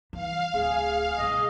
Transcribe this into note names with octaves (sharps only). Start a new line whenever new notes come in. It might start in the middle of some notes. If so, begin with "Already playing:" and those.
E3 F5
D1 G#4
B2 G3 D#5